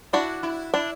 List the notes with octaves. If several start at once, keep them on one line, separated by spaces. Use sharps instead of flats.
D4 E4 F#4
E4
D4 E4